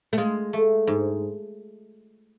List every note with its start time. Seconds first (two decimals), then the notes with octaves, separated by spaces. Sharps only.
0.13 A3
0.18 G#3 F4
0.53 A3
0.87 G#2